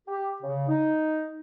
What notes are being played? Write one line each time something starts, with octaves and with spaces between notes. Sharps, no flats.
G4
C#3
D#4